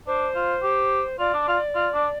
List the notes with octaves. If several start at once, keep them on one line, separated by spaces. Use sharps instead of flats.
D4 C5
F4
G4
F4 D5
D4
F4
F4
D4